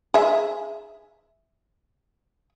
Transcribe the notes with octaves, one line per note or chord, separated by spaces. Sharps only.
G#4 E5